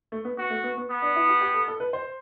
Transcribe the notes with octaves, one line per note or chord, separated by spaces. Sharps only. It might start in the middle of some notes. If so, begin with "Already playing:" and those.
A3
B3
B3 F#4
A3
B3
B3
B3
D4
E4
G4
G4
A4
A4
B4
C5